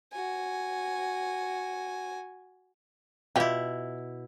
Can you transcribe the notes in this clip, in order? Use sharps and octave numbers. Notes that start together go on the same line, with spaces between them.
F#4 G#5
B2 E4 F4 G4